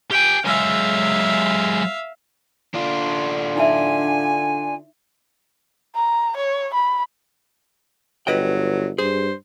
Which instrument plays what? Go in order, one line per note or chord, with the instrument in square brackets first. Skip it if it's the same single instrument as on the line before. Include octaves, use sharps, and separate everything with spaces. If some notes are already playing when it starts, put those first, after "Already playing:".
[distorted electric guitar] G4 G#5 [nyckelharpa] G5
[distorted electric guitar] F#3 G#3 [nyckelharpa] E5 F5
[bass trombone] D3 [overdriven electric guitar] D4 F4
[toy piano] D#4 E4 E5 [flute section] G#5
[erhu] A#5
C#5
B5
[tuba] G1 [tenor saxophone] F#3 [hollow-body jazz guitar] B4 D#5 G5
[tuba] G2 [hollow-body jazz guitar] G#4 [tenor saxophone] C5